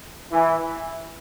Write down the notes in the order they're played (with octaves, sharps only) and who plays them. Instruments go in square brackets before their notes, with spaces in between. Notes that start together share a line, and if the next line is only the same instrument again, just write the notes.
[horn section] E3